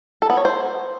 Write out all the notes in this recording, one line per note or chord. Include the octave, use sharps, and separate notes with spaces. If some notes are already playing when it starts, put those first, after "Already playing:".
A4
B3
C#5
C5